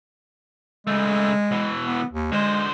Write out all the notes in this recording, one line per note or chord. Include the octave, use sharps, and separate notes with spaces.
C#3 G#3 A3
B2 E3
B3
D#2
D3 G#3 C5